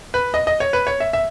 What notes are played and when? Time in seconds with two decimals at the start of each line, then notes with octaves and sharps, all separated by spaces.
0.14 B4
0.34 D#5
0.47 D#5
0.60 C#5
0.73 B4
0.87 C#5
1.00 E5
1.13 E5